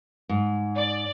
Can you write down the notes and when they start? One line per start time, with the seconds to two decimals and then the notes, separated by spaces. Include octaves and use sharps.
0.29 G#2
0.76 D5